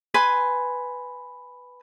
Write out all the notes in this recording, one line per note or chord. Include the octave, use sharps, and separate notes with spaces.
B4 G#5 C6